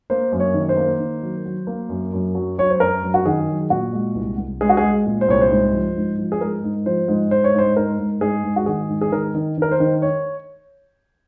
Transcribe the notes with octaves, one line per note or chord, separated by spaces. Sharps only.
A#3 C5
F#2
C#5
D#3
C5
A#3
D#3
F#3
F#3
A#3
F#2
F#2
F#3
F#3 C#5
C5
F#2 A#4
F#2
F#4
D#3 G#4
F#3
A#2 F#4
G#3
C2
C2
G#3 G#4
F#4
G#4
G#3
A#2
C5
C2 C#5
C5
G#2
F3
G#2
F3
G#4
G#2 A#4
G#2
F3 C5
G#2
G#2 C5
C#5
G#2 C5
G#2 A#4
G#2
G#2 G#4
G#2
F#4
D#3 G#4
G#2
G#4
D#3 A#4
D#3
D#3 A#4
C5
D#3
C#5